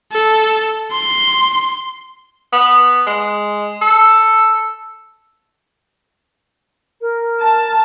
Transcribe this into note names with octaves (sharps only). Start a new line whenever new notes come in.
A4
C6
B3
G#3
A4
A#4
A5